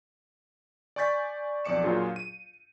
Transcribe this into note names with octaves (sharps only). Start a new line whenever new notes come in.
D5 G#5 C#6 G6 A6 B6
B1 F2 D5 D6 C#7 E7
A#2 F#3 D4 F4 G#4
D#7